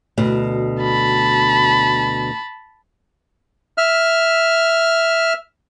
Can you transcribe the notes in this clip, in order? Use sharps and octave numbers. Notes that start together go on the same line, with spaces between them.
D2 B2
A5 B5
E5 F6